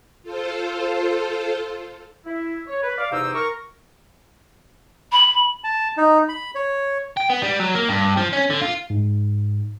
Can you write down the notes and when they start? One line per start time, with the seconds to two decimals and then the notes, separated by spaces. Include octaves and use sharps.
0.23 F4 A4 C5
2.26 E4
2.67 C#5
2.82 B4
2.98 D5 F5
3.12 E2 C3 D#4 C5 D6 E6
3.34 A#4 C#6
5.12 B5
5.64 A5
5.98 D#4
6.29 B5
6.55 C#5
7.17 G5
7.30 B3
7.42 G3
7.60 F#3
7.75 A#3
7.89 G2
8.17 F3
8.33 C#4
8.50 D3
8.61 F4
8.90 G#2